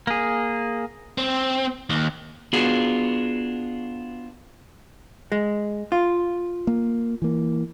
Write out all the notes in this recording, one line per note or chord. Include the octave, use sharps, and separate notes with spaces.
A#3 G#4
C4
D#2
B3 D4 F4 F#4 G#4
G#3
F4
A#3
E3 A#3